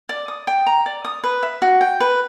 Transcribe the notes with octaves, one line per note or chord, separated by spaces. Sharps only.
D5
D#6
G5
A#5
D5
D#6
B4
E5
F#4
G5
B4